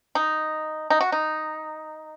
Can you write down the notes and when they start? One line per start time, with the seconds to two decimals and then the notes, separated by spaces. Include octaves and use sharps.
0.15 D#4
0.90 D#4
1.01 F#4
1.12 D#4